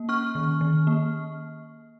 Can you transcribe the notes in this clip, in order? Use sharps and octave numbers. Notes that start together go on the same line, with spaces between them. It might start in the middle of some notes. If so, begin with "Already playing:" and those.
Already playing: A#3
C#4 C#6 F6
D#3
D#3
A#3